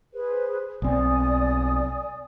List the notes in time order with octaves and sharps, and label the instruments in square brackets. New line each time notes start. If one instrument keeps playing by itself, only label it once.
[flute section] G#4 B4 C5
[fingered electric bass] B1 C4 [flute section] D5 G#5 D#6